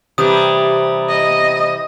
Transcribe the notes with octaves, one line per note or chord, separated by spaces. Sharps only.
C3 E3 G3 D#6
D#5